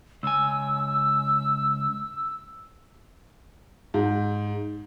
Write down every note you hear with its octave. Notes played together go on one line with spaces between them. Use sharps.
C#2 G#5 E6
G#2